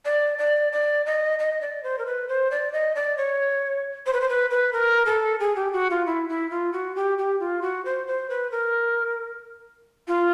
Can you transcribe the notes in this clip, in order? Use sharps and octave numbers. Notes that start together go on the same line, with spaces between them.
D5
D5
D5
D#5
D#5
D5
C5
A#4
B4
C5
D5
D#5
D5
C#5
C5
B4
C5
B4
B4
A#4
A4
G#4
G4
F#4
F4
E4
E4
F4
F#4
G4
G4
F4
F#4
C5
C5
B4
A#4
F4